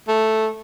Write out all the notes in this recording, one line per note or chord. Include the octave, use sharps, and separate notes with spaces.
A3